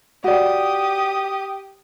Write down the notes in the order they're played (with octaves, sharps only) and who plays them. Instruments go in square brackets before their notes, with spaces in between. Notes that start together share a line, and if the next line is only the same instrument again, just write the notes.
[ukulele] F#4 D5 [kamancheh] G4 D#6